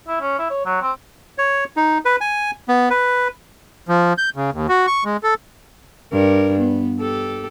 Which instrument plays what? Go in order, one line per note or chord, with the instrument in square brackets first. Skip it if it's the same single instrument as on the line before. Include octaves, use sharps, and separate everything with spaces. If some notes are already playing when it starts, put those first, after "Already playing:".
[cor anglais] E4
C#4
E4
C#5
F#3
C4
[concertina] C#5
D#4
B4
G#5
B3
B4
[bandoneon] F3
G6
C#3
D#2
F#4
C#6
G#3
A4
[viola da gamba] G2 A#4
B3
G4 A4